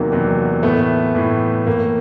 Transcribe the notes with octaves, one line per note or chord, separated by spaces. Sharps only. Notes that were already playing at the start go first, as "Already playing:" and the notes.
Already playing: E2 C3 D#3 F#3 A#3
E2 C3 D#3 F#3
A2 E3 A3 B3
A2 E3
A2 E3 A#3